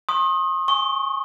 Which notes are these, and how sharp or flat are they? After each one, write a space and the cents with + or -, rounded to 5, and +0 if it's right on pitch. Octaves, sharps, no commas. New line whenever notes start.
C6 +45 D#6 +0
G#5 +0 C#6 -10